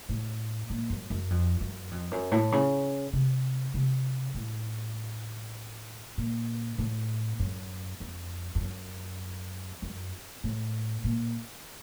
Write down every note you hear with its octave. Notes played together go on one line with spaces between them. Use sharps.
A2
A#2
F#2
F#2
F2
F#2
F2
F#2
A2
C#3
C3
C3
A2
A#2
A2
F#2
F2
F2
F#2
F#2
A2
A#2